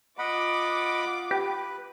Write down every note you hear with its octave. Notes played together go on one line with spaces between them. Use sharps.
F4 D#5 F#5 B5 D6
G4 B4